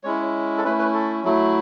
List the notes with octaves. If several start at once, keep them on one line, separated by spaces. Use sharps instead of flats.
G#3 C#4 E4 C#5
A4
A3 C#4 E4 B4
B4
A4
F#3 A3 E4